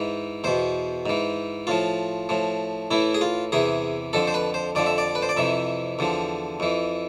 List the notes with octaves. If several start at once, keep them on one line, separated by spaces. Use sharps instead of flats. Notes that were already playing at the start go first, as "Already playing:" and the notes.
Already playing: G#2 E3
E2 B2 C5
G#2 E3
A2 F3 F4
A2 F3
A2 E3 E4
G#4
F4
E2 C3 E3 G#4
F2 D3 F3 A4
C5
B4
C5
F2 D3 F3 D5
E5
D5
B4
C5
D5
F2 C3 E3 E5
E2 D3 F3
F2 E3